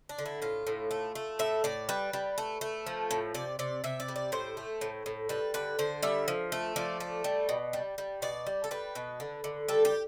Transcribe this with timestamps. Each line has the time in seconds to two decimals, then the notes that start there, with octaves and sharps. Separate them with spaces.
0.09 D4
0.18 D3
0.26 E4
0.42 A2 F4
0.67 A2
0.91 A3
1.15 A3
1.39 A2 E5
1.64 A2 D5
1.89 G3 B4
2.13 G3
2.38 A3
2.61 A3
2.86 F3
3.11 A2
3.34 C3 D5
3.59 C3 D5
3.84 C3 E5
4.00 D5
4.08 G3
4.16 D5
4.32 A2 C5
4.57 A3
4.81 A2
5.06 A2
5.29 G3 B4
5.54 D3 B4
5.79 D3 C5
6.03 G3 E5
6.28 F3
6.52 A3
6.76 F3 D5
7.00 A3
7.24 G3
7.49 B2
7.73 G3
7.98 G3
8.22 B2 D5
8.47 G3
8.64 A4
8.71 G3 B4
8.95 B2
9.20 D3
9.44 D3
9.68 G3 A4
9.85 G4